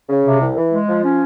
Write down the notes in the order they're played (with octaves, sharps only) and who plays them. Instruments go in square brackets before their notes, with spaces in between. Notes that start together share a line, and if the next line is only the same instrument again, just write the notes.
[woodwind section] C#3
C3
C2
E3
G#3
F3
C#4